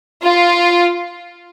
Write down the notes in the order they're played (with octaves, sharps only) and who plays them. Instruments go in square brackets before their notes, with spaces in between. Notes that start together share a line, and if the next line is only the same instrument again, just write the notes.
[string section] F4